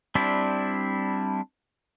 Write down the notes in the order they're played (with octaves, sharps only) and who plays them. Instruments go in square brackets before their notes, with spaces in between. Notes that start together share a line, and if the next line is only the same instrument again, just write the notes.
[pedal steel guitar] G3 C4 D4 E4